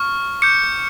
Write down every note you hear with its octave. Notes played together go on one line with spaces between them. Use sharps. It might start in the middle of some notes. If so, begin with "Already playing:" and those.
Already playing: C#6 F6
D6 G6 C#7